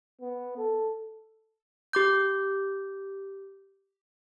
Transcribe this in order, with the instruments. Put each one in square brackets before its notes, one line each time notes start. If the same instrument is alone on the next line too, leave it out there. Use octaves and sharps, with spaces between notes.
[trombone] B3
A4
[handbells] G4 D6 G6